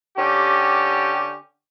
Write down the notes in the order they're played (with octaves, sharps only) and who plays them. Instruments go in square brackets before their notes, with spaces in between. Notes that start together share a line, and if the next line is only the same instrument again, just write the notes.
[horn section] D3 C#4 G4